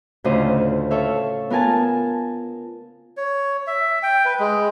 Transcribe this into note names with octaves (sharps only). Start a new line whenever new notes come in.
D2 A2 C#3 F4 C5 D#5
A4 C#5 E5 F5
B3 F4 A#4 G#5 A5
C#5
E5
G5
B4
G#3